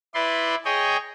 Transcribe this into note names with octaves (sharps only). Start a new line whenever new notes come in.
E4 B4 D5 C6
G#4 C#5 D#5 G5